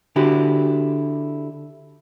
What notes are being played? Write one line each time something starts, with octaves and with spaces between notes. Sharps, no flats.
D3 E4 F#4 G4